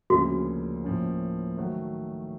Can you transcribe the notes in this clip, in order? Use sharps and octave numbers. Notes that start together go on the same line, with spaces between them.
D2 C#3 F3 A#3 C#4 F#4
A2 F3 A#3 C#4
D#3 F#3 A3